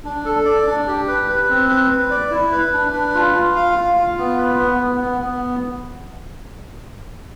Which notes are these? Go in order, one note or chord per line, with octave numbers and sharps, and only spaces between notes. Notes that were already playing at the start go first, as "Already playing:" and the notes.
D4
A4
D5
D4
G4
B4
B4
C4
B4
B4
D5
E4
B4
D4
B4
F4
F4
F5
F4
F4
B3
B4
B3
B3
B3
B3